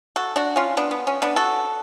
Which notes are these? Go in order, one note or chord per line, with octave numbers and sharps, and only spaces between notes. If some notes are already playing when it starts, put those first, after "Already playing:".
F#4 A4
D4 F#4
C#4 F4
B3 D4
B3
C#4
B3 D4
F#4 A4